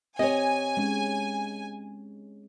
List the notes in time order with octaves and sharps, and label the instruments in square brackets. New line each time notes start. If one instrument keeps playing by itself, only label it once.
[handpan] C4 G4 [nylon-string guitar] C#5 D#5 [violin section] G#5
[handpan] G#3 C#4